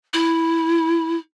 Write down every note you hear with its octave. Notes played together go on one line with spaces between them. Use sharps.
E4